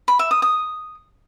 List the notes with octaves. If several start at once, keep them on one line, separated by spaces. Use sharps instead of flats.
B5
E5
D#6
D#6